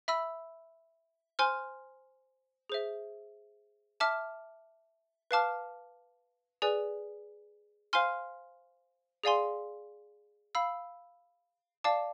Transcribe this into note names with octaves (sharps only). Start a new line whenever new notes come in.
E5 B5 E6
C5 G#5 C6 F6
G#4 C5 E5
E5 A5 D6 F6
B4 F5 A5 D6 F6
G#4 B4 D5 G#5
C5 F5 G#5 C6 F6
G#4 D5 F5 G#5 C6
F5 B5 E6
D5 F5 A5 D6